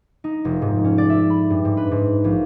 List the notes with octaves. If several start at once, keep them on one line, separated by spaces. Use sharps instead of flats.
D#4
F1
G#2
C#4
D5
E5
B5
G2
G#2
B4
G#2
A#1